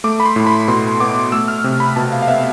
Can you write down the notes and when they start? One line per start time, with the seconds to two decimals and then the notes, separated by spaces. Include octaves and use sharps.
0.04 A3 D6
0.20 B5
0.25 C6
0.36 A2
0.47 B5
0.68 B2 C6
1.00 B3 D6
1.32 A3 E6
1.48 F6
1.64 C3
1.80 B5
1.96 B2 A5
2.12 F5
2.22 F5
2.28 B3 E5